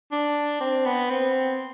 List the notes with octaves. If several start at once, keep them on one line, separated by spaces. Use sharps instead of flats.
D4
C4
B3
C4